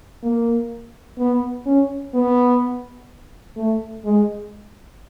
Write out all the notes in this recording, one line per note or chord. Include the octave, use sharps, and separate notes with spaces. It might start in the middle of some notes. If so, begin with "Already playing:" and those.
A#3
B3
C#4
B3
A3
G#3